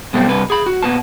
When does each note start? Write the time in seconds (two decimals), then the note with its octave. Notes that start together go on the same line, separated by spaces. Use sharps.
0.13 F#2 B2 G3 A3 C4
0.28 G2 C3 B4
0.50 G#4 B5
0.66 F#4
0.83 A#2 B3 A5